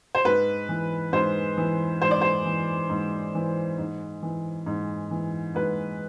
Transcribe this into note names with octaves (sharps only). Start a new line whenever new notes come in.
C5
G#2 B4
E3
G#2 C5
E3
G#2 C5
D5
C5
E3
G#2
E3
G#2
E3
G#2
E3
G#2 B4